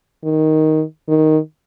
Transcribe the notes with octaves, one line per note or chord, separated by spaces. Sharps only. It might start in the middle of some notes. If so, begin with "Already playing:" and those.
D#3
D#3